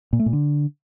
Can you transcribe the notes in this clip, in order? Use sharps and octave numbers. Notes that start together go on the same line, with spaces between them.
A#2
A3
A#2
D3